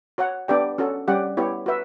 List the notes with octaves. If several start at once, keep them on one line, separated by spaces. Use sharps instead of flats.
F#4 C#5 F#5
B3 D4 G4 D5 G5
C#4 F#4 A4
G3 C#4 G4 D5 F#5
B3 E4 G4 C#5
F#4 B4 E5